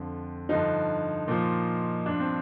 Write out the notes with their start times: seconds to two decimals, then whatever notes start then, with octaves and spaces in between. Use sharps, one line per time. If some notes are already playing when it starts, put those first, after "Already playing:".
Already playing: F2 D3 F3
0.49 G2 D3 F3 D#4
1.28 A#2 F3
2.06 G2 F3 D4
2.20 C4